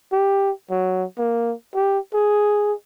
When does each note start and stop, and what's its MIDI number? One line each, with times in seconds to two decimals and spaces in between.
0.12 0.51 67
0.70 1.04 54
1.18 1.53 58
1.75 1.99 67
2.14 2.73 68